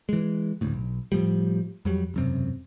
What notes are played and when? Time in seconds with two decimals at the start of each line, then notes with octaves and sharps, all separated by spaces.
0.09 E3 G#3
0.61 E1 D2 A2
0.73 B1
1.12 A2 F3 G3
1.85 F2 F#3 G3
2.14 E1 F#2 C3